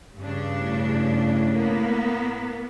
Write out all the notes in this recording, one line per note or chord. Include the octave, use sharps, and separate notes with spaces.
G2 C#3 D4
A2
A#3 B3